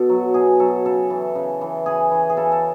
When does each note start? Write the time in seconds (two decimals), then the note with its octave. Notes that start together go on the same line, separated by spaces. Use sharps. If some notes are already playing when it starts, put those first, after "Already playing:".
Already playing: B2 A4
0.09 F#3
0.34 B2 G#4
0.59 F#3 A4
0.85 C#3 A4
1.10 E3
1.35 C#3
1.61 E3
1.86 C#3 G#4
2.11 E3
2.30 G#4
2.37 C#3 A4
2.52 A4